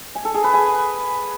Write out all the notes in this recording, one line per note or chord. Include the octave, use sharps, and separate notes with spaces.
G#5
A4
G#4
B4
G#5